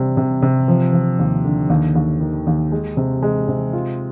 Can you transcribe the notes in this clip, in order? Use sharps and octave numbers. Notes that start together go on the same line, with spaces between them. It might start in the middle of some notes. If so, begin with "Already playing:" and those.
Already playing: C3 G3
C3
C3
F3
F3
D#2
D3
D#2
D#2
D#3
D#2
G#3
C3
G#3
C3
F4